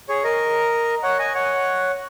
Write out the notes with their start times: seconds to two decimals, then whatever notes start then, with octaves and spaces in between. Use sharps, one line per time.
0.09 G#4 C#5
0.24 A#4 D#5
1.03 C#5 F#5
1.19 D#5 G#5
1.34 C#5 F#5